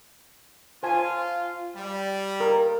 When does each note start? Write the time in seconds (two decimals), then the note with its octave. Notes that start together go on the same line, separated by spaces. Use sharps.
0.83 F4 C5 G#5 A5
1.76 G3
2.40 A#4